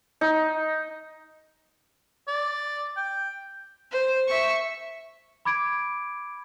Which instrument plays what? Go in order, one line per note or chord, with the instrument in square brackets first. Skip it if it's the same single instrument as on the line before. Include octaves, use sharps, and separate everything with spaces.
[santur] D#4
[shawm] D5
G5
[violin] C5
E5 C#6
[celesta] B5 D6 G#6 D7